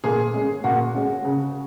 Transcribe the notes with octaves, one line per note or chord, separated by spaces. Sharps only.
A#2 G#4
G#3 C#4
A#2 F#4
G#3 C#4
C#3